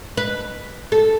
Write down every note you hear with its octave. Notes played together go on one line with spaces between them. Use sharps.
B4
A4